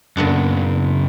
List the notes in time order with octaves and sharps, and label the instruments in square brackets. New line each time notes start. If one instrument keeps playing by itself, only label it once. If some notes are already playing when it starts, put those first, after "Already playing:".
[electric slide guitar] F#2 C#3 [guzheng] A#2 B3 D4